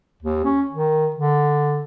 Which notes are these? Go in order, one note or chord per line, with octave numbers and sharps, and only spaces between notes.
D#2
C#4
D#3
D3